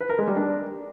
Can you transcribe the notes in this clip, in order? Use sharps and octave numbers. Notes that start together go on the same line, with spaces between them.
B4
A#4
G#3
G3
D4